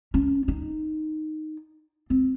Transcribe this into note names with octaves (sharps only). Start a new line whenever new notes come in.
C#4
D#4
C4